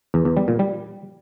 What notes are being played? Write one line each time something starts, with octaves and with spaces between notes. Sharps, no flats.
E2
E2
G3
A#2
G3